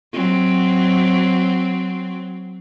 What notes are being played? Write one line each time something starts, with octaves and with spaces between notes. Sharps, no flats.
F#3 C4